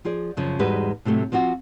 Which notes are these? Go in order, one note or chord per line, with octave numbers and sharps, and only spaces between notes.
F3 F4 G#4 D5
F#2 C#3 F3
E2 G#2 G3 G#3 F#4 B4
A2 C3 F#3 A3
F3 C4 F4 F#4